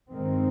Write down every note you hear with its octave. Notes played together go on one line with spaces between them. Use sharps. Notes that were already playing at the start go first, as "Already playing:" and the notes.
G2 D#3 G#3 C4